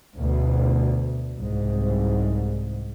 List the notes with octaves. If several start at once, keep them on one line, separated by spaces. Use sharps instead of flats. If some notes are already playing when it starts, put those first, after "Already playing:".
D2 B2
C2 G#2